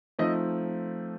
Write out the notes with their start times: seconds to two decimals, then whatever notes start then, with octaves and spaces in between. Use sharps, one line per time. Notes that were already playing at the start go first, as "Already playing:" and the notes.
0.19 F3 A3 C4 D#4 D#5